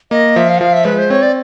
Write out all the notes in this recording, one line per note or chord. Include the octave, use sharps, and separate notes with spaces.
A#3 D#5
F3 E5
F5
F#5
F3 F5
E5
G#3 B4
C5
C4 C#5
D5